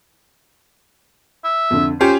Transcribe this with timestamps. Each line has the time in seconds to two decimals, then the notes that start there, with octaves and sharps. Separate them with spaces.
1.45 E5
1.70 F2 D3
2.01 C#4 F4 G4 C5